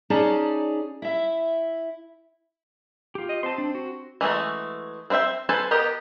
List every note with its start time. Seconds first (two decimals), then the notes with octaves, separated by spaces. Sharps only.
0.10 C#4 D#4 G#4 D5 A5 A#5
1.02 E4 E5
3.15 F4 G4
3.29 D#5
3.43 C4 A5 C6
3.58 D4
3.75 F#4
4.21 E3 G#3 A3 F#4
5.10 C4 B4 C5 E5 G5
5.49 A4 B4 C5 G#5 A5
5.71 B3 G4 A#4 D#5